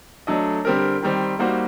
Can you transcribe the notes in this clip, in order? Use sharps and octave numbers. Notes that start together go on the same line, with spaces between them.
F#3 A3 D4 A4 D#5
D3 G3 C4 G4 A#4
D#3 G3 C4
G3 A#3 D#4 F#4 C5